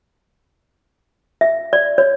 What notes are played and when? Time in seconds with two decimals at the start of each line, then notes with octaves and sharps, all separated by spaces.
1.41 E5
1.73 D5
1.98 C#5